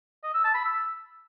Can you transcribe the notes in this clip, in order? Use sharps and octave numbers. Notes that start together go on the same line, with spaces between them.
D#5
E6
A5
B5
E6